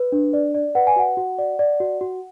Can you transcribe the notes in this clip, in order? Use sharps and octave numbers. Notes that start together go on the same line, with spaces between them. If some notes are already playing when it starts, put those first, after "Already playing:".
Already playing: B4
D4
D5
D5
B4 F#5
G#5
F#4 F#5
F#4
D5
D5
F#4
F#4